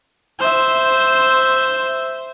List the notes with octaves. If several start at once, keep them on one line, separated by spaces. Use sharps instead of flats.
C5 E5